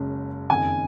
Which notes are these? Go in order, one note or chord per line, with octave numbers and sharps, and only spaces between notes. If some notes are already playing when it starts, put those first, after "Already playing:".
Already playing: F#1 F#2 C#3 G#3
F#1 F2 D#3 G#5